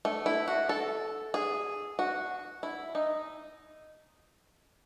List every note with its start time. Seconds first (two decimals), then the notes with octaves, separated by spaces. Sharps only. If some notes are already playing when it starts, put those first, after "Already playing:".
0.05 A3
0.26 E4
0.48 F#4
0.69 A4
1.34 G#4
1.99 F#4
2.63 E4
2.95 D#4